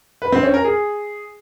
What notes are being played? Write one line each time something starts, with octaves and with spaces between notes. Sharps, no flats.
B4
C4
C#4
A#4
G#4